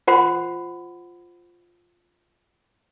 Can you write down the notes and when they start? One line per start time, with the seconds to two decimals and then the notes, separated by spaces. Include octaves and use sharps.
0.07 F4 C5 F#5 B5 C6